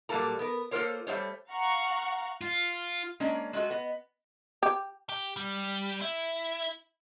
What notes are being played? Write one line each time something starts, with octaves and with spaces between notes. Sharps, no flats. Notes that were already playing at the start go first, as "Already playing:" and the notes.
A#2 F#3 G3 A#3 A4 A#5
B3 A#4
A#3 F4 A4 A#4 C5 C#5
G3 A3 C4 C5 C#5
F5 F#5 A#5 C#6
F4
G#3 A#3 C#4 D4
G#3 A3 F4 F#4 A4
B3 D#5
G4
G4
G3
E4